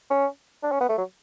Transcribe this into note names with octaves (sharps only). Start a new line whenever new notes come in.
C#4
D4
C#4
B3
A3
F#3